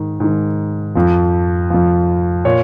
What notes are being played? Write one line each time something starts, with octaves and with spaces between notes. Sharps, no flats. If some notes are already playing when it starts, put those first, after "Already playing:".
Already playing: G#2 D#3
G#2 D#3
F2 F3
F2 F3
A#2 C#5